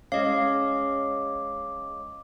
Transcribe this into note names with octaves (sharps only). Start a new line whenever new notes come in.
G#3 C#4 D#5 F5 D6